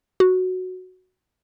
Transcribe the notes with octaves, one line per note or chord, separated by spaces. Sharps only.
F#4